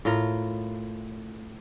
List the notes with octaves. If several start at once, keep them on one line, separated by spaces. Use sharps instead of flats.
A2 F4 A#4